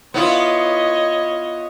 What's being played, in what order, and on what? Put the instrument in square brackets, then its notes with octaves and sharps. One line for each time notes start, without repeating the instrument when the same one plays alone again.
[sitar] B3 E4 F4 [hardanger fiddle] C#5 D#5